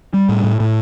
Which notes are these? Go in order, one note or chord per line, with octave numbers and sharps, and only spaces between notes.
G3
A2
A2
A2